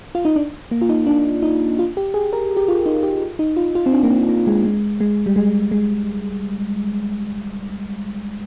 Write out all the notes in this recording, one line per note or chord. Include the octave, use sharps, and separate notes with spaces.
F4
D#4
D4
A#3
F4
D#4
D4
D#4
F4
G4
G#4
A#4
G4
F4
D#4
G4
D#4
F4
F4
C4
D4
A#3
C4
A#3
G#3
G#3
G#3
G3
G#3
G#3